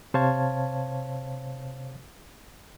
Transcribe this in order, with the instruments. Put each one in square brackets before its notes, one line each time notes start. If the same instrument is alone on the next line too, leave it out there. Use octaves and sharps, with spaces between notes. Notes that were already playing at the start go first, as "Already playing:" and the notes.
[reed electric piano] C3 C5 C#5 F5 A5 G#6